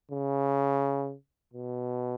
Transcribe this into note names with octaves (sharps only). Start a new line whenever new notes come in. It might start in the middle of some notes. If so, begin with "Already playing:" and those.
C#3
B2